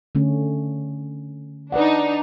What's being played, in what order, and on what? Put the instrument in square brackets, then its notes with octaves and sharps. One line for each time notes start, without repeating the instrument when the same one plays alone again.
[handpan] D3 A3 C#4
[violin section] D4 D#4 [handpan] B4 D5 F#5